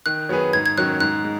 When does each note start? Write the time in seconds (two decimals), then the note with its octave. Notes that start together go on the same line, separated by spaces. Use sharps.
0.06 D#3 F#6
0.29 F#3 B3 G#4 B4
0.53 G#2 G#6
0.66 G#6
0.78 D#3 F#3 C#4 F#6
1.00 G#2 F#6
1.24 G#3